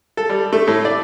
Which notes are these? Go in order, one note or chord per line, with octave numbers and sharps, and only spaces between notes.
A4
G3
A3
A2
D5